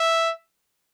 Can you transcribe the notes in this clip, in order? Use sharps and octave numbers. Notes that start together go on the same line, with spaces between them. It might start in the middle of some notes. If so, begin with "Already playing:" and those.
Already playing: E5